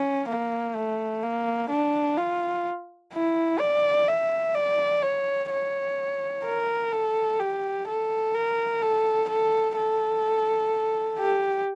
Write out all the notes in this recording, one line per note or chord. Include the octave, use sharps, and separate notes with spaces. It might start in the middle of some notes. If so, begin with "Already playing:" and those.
Already playing: C#4
A#3
A3
A#3
D4
F4
E4
D5
E5
D5
C#5
C#5
A#4
A4
G4
A4
A#4
A4
A4
A4
G4